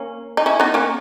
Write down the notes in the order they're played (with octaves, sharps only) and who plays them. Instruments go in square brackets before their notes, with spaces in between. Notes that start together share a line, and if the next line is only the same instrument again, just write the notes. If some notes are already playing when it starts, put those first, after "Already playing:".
Already playing: [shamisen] A#3 C#4
D#4
C#4 E4
B3 D#4
A#3 C#4